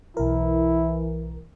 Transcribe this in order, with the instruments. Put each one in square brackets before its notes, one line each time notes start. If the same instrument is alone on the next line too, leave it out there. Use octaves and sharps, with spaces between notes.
[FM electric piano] B1 A#4 [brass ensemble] E3 [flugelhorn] E4